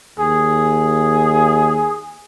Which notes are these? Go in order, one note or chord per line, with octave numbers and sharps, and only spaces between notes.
D#2 G#4